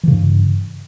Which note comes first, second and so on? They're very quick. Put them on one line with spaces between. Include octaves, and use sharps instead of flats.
E3 C#3 G2